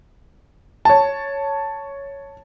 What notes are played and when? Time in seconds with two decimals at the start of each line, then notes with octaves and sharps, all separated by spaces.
0.85 C#5 A5